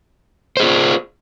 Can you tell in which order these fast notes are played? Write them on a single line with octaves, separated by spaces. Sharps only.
C5 G#4 F4